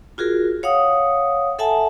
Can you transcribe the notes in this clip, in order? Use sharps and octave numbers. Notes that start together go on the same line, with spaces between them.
F4 F#4 G#4 A#4
C#5 F5 F#5 D#6
A4 E5 F#5 G#5 A5